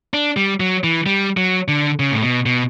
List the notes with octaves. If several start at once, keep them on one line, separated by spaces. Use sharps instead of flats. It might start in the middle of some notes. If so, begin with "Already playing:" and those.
D4
G3
F#3
E3
G3
F#3
D3
C#3
A2
B2
B2